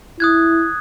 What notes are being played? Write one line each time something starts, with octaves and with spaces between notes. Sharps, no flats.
E4 D#6 F#6 G#6